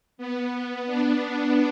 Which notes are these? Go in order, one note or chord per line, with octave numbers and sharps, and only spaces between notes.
B3
D4